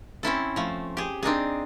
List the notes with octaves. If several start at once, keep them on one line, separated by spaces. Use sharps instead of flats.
C4 C#4 E4 A4
F3 A3
G4 G#4
C4 D4 D#4 G#4